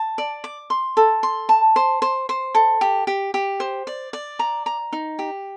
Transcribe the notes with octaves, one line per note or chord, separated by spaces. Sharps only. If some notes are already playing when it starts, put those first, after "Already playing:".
Already playing: A5
D5
D6
C6
A4
C6
A5
C5
C5
C5
A4
G4
G4
G4
C5
D5
D5
A#5
A#5
D#4
G4